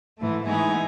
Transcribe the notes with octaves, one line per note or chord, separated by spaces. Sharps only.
G#2 E3 A3
E3 G#3 B3 D#4 G#4